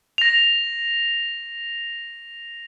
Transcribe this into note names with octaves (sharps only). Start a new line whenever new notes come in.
A#6 F7